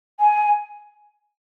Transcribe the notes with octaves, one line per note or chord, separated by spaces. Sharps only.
G#5